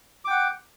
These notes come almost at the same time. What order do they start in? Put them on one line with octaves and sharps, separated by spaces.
D6 G5 F#5